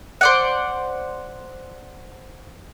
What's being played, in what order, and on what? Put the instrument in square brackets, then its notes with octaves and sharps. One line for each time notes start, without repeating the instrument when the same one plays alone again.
[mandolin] C5 D5 F#5